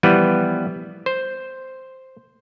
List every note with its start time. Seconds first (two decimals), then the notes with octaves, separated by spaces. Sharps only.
0.03 E3 F3 G3 B3 F4 B4
1.06 C5